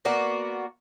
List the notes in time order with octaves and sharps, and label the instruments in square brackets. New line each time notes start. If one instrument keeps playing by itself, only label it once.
[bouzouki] A#3 B3 F#4 D5